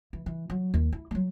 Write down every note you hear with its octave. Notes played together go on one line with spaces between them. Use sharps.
E3
E3
F#3
D#2
E4
F#3 G3